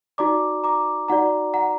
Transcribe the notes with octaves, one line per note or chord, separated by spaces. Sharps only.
D#4 F#4 D5 A#5 D6
A#5 D6
D#4 F#4 D5 F#5 A#5
F#5 A#5